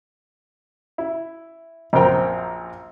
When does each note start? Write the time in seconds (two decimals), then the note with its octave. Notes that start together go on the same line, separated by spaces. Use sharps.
0.98 E4
1.93 A#1 F#2 C4 A#4 G5 A#5